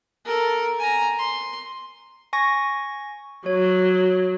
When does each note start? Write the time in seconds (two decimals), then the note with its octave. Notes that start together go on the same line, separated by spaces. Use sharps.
0.24 A4 A#4
0.78 G#5 A#5
1.19 C6
2.33 G#5 C#6 A#6
3.46 F#3 C#5